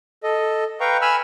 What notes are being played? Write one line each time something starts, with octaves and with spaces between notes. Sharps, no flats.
A4 D#5
B4 F5 G5 A#5 C#6
G#5 B5 E6 F6